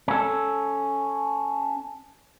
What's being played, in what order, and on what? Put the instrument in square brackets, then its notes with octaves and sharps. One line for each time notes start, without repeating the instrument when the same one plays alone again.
[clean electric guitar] C#4 A4